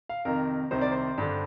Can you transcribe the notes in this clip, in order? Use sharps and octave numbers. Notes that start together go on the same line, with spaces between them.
F5
F2 C3 D#3 A#4
C2 C3 D#3 C5
D5
C5
G2 D3